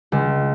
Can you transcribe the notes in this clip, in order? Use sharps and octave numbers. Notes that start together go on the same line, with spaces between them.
C#2